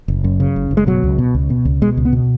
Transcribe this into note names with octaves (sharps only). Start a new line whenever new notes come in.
F#1
F#2
C#3
F#1
F#1
G#3
B2 F#3
C#2
B2
C#2
B2
C#2
B2 G#3
C#2
B3
B2